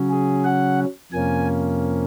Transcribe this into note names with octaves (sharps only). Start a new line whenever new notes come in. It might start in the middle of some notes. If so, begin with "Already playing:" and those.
Already playing: C#3 F#3 C#4
G#4
F#5
F2 C3 F3 A#3 C#4 G#5